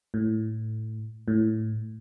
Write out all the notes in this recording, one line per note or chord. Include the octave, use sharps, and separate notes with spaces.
A2
A2